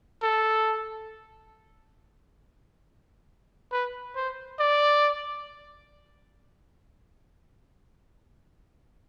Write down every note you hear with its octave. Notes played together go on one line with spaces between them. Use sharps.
A4
B4
C5
D5